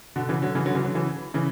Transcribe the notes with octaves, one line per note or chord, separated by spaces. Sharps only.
B2 D3
C#3 E3
D3 F#3
C#3 E3
D3 F#3
C#3 E3
D3 F#3
C#3 E3
C#3 E3